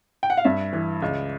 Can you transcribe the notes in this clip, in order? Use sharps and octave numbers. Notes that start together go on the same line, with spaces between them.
G5
F#5
F5
G2 E5
E3
C#2